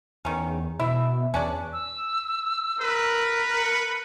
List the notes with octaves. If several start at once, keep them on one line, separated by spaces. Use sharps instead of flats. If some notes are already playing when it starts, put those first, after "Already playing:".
E2 D#3 C#4
B2 E4 E5
E2 C#4 D4 D5
E6
A#4 B4
C#7